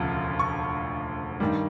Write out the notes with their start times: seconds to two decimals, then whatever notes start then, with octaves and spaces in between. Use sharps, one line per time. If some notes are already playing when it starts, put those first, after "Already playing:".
Already playing: E1 D2 C#3 F3
0.39 C#6
1.40 G2 D#3 G3